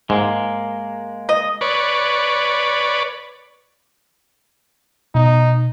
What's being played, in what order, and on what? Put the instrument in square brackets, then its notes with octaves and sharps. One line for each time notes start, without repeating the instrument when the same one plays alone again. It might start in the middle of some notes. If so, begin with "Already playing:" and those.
[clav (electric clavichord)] G#2 [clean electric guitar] G#3 A#3
[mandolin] D#5
[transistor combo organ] B4 C#5 D5
[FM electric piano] B2 [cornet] D#4